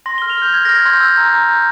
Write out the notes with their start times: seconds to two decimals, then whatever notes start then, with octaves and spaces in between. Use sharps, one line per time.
0.06 C6 A#6
0.18 F6 G7
0.30 F7
0.38 F6 G6
0.53 F6 G#6
0.65 F6 A#6
0.78 G#6
0.86 C6 G6
1.01 E6 G6
1.17 A#5
1.33 A#5
1.49 A#5 G6